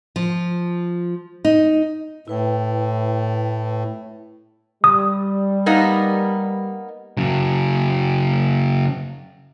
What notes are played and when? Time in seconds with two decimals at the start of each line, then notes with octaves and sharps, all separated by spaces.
0.16 F3
1.45 D#4
2.28 A2 E4 B4 G5
4.84 G3 D#6
5.66 A#3 B3 D#4
7.17 C#3 F#3